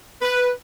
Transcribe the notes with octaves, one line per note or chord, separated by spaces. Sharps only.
B4